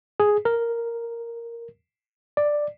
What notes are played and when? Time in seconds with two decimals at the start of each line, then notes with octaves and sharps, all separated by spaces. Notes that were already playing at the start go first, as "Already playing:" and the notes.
0.20 G#4
0.45 A#4
2.37 D5